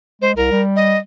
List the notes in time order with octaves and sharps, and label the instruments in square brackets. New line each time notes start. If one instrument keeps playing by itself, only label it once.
[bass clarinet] G#3 [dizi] C5
[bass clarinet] C2 [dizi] A#4
[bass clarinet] G3
[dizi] D#5